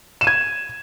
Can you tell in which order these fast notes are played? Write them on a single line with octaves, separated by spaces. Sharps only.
E7 D#7 G#6